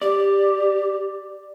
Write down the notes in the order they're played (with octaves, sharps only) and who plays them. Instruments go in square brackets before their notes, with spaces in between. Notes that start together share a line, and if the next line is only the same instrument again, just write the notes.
[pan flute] G4 [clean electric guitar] D5